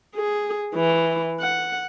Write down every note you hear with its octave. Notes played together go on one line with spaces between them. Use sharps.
G#4
E3
F#5